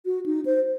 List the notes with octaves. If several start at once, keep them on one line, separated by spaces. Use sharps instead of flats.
F#4
D#4
C5